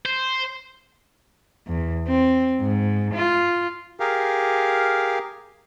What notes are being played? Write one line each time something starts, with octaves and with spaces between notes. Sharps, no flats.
C5
E2
C4
G#2
F4
G4 G#4 A#4 F5